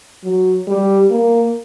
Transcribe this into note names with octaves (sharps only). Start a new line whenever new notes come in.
F#3
G3
A#3